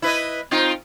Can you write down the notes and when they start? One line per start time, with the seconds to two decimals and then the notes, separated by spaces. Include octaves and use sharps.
0.02 E4 B4 D#5
0.51 C4 D#4 F4